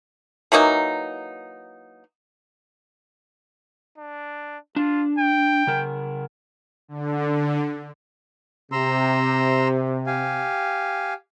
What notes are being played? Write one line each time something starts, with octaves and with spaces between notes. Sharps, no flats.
E3 F#3 A#3 D#4
D4
D4 F4
G5
C#3 A#4
D3
C3 A#5 C6 E6
G4 F5 G#5